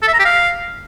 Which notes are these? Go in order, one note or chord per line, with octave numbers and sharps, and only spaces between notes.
A4
E5
A#5
G4
F5